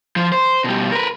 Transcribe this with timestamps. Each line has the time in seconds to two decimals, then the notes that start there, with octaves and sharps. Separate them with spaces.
0.16 F3 C5
0.32 C5
0.64 B2 G3
0.92 A#4 B4